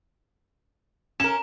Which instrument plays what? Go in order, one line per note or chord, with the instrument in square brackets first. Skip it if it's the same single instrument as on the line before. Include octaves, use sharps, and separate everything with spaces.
[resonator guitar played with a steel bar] C#4 A#4 [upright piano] E7